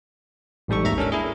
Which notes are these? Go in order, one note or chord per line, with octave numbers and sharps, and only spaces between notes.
A1 G#2 G3 A4 C#6
G#1 D#2 E5 A#5
C#4 D4 A4 A#4
E4 G#4